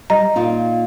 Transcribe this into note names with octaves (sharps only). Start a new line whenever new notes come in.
G3 D#5 A#5
A#2 D#4 F4